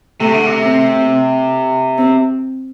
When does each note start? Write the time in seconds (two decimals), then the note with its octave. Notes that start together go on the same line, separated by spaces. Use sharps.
0.20 C3 A3
0.33 D3
0.47 C3
0.64 C4
1.98 C4